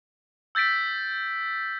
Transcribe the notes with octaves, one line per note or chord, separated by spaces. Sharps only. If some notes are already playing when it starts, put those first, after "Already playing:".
E6 G6 A6 B6 D7